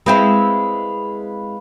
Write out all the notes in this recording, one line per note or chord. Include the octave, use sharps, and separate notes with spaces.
G#3 C4 E4 B4 F5 B5